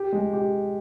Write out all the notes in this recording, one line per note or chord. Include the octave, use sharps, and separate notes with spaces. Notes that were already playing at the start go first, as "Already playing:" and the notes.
Already playing: G4
G#3
G4